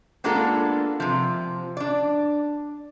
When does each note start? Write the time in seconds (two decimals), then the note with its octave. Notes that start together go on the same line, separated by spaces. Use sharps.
0.24 G#3 A#3 B3 D4 F4 A4
1.00 C3 F3
1.77 D4 D5